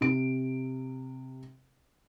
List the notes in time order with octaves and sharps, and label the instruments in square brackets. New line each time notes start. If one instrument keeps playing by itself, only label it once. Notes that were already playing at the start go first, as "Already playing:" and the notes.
[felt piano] C3 D7